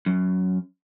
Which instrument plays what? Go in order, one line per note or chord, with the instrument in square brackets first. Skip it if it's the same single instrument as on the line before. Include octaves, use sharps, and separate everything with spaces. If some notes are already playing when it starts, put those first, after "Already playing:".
[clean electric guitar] F#2